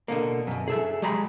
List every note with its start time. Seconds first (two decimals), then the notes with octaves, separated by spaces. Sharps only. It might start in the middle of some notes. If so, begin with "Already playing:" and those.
0.08 B2 D3 A#3
0.47 F#2 B2
0.68 G#4 A4 E5
1.02 F#3 G#3 G4 G#4 A#5 B5